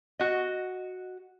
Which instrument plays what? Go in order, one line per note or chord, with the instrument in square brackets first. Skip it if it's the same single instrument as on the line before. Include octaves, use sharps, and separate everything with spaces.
[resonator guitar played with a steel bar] F#4 D#5